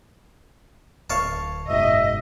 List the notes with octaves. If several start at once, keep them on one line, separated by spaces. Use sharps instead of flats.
D1 C#5 F5 A5
F#1 G#2 B2 D#5 E5